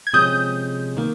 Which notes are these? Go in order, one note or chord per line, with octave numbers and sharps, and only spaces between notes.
G#6
C3 F3 G#3 C#4 D#6 G6
D#3 A#3